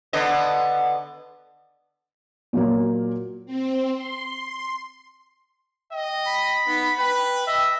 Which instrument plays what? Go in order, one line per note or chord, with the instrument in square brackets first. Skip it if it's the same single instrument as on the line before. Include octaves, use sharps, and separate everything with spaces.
[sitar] D3 B3 D#5
[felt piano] A#2 F#3 A#3
[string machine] C4
C6
[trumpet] D#5 [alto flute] G5
[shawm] B5
[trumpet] B3 [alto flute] D#4
[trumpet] B4 [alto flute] G5
[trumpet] D#5 [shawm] E5